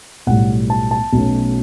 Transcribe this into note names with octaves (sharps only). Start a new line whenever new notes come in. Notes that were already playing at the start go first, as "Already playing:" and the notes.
B1 A2 G3 F#5
A5
A5
B1 B2 A3 C#4